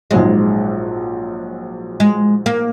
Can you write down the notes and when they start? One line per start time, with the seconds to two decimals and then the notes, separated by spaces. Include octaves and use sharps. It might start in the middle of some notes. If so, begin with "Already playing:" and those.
0.11 A#1 G#2 F#3 G#3
2.00 G#3
2.46 A#3